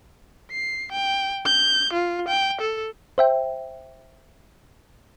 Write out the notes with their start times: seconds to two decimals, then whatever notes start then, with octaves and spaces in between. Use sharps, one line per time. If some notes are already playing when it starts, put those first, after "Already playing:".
0.51 C7
0.92 G5
1.46 G6
1.94 F4
2.28 G5
2.61 A4
3.18 C5 E5 G5